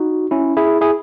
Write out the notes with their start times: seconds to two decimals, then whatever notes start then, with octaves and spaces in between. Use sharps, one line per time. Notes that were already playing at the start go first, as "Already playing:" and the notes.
Already playing: D#4 F#4
0.31 C#4 E4
0.57 E4 G#4
0.81 E4 G#4